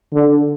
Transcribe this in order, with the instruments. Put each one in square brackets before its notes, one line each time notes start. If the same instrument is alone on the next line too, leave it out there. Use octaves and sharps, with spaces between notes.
[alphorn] D3